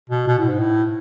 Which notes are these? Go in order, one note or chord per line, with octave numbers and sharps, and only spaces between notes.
B2
B2
A2
G#2
A2